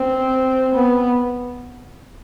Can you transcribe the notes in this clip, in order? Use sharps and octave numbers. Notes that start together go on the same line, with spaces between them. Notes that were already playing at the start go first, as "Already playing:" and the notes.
Already playing: C4
B3